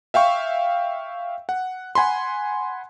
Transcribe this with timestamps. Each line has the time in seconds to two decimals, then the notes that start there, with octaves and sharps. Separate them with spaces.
0.14 E5 F5 G5 C#6
1.49 F#5
1.95 F#5 G#5 B5 C6